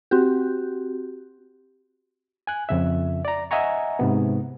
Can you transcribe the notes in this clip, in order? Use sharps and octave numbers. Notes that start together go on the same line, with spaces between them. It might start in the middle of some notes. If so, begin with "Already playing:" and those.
C4 F#4 G4
G#5 F#6
F2 C#3 E5
D5 A#5
D#5 E5 F#5 G#5 A#5 C#6
G#2 C3 B3